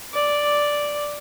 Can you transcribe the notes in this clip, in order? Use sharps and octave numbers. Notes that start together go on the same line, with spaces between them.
D5